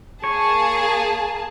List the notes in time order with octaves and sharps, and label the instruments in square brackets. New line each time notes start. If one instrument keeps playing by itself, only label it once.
[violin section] A#3 G#4 A5 [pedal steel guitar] C#5